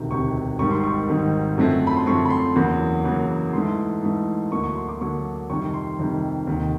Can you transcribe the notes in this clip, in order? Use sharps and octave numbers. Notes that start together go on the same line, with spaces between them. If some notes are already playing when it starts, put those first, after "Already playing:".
Already playing: E1 D2 C3 D#3
E1 D2 C3 D#3 C#6
G#1 G#2 D#3 G3 C#6
C6
C#6
G#1 G#2 D#3 G3
F#2 D3 F3 A3 C4
B5
C6
F#2 D3 F3 A3 C4 C#6
B5
C6
E2 C#3 F#3 A#3 B5
E2 C#3 F#3 A#3
G#2 E3 A3 C6
G#2 E3 A3
D2 D3 F#3 A#3 C#6
C#6
C6
D6
D2 D3 F#3 A#3 C#6
F2 C3 D#3 G3 C#6
C6
F2 C3 D#3 G3
F1 D#2 D#3